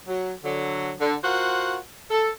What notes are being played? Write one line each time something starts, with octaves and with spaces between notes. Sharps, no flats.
F#3
D3 F#3
D3
F4 F#4 A#4 C5 F5 F#5
A4